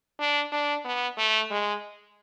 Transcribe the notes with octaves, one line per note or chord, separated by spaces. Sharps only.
D4
D4
B3
A3
G#3